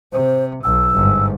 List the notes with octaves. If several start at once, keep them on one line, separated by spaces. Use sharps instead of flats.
C3 C5
B1 E6
G1 G#2